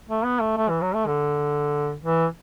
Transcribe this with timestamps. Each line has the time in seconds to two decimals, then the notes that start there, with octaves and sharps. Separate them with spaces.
0.09 A3
0.24 B3
0.41 A3
0.57 A3
0.69 E3
0.81 F#3
0.94 A3
1.07 D3
2.04 E3